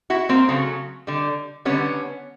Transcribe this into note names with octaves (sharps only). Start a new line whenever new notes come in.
E4 F#4
A#3 C4
C#3 F#3 A3
D3 G3
D3 G3 B3 C#4